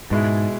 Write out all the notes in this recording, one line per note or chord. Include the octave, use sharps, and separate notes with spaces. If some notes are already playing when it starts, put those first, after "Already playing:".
G#2 B2 G#3 E4